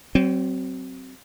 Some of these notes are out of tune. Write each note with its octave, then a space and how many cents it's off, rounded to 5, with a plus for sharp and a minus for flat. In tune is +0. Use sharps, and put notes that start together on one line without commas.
F#3 +35 C4 +0